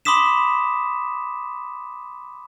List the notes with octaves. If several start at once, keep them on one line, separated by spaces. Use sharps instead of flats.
B5 C6 D6 D#6 B6 E7